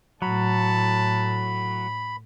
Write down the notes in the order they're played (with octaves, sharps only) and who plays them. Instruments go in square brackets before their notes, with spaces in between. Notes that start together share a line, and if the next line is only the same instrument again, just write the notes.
[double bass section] A2 [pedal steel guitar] F#3 [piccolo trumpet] A5 [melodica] B5